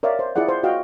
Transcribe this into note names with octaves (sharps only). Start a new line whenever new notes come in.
A#4 C#5 D5 E5 F5
C5
E4 F4 G#4 D5 F#5
C5
F4 F#4 D#5 F5 G5